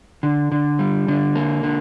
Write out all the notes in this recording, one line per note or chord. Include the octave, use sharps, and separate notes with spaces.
D3
D3
G3
D3
A#3
D3